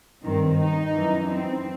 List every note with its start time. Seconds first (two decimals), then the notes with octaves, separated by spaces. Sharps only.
0.22 G2 D#3 C4
0.58 D#4
0.94 F#2 E3
1.30 C4